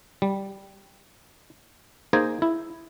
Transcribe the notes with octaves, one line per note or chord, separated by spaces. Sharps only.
G3
A#3 D#4 G#4 C5 D#5 G#5
E4